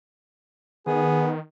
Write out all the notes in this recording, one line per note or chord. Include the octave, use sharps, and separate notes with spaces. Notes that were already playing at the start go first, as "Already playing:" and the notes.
D#3 B3 G#4